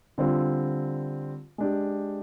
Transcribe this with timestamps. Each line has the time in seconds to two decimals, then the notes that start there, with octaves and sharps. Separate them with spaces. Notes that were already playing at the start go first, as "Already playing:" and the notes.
0.18 D3 G3 C4 F4
1.58 G#3 D4 G4